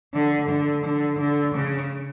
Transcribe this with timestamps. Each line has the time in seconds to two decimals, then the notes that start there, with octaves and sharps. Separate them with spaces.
0.14 D3
0.49 D3
0.84 D3
1.19 D3
1.54 C#3